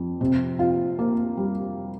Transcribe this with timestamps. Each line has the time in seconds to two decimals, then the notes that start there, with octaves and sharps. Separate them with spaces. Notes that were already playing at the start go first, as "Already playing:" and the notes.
Already playing: F2
0.21 C3
0.59 F4
0.99 A#3
1.37 G3